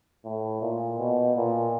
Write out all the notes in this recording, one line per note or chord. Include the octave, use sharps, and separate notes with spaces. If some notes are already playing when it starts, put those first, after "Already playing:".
A2
A#2
B2
A#2